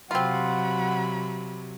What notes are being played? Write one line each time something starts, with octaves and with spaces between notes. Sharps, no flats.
C3 F#3 C4 F4 F#5 B5